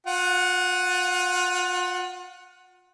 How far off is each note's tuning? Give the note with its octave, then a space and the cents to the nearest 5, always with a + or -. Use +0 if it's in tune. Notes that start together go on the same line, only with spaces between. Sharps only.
F4 +35 F#5 +0